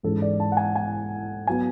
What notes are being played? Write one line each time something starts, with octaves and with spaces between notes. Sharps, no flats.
G#2 E3 G#3 C#4 A4
D5
A5
F#5
G#5
G#5
F#3 B3 G#5